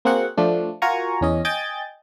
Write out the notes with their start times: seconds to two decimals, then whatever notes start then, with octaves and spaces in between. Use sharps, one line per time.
0.05 A#3 C4 F#4 G#4 F#5
0.37 F3 A3 D4
0.82 F4 F#4 A#4 G#5 A#5 C#6
1.21 E2 C#4 D#5
1.45 D#5 G5 G#5 G6 A6